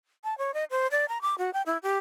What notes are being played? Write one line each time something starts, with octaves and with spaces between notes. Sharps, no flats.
A5
C#5
D#5
C5
D5
A#5
D6
F#4
G5
E4
G4